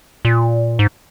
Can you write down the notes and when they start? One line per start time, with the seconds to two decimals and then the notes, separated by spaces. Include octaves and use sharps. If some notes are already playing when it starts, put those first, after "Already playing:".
0.25 A#2
0.79 G#2